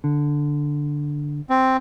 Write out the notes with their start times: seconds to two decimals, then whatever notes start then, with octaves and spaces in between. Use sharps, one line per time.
0.04 D3
1.50 C4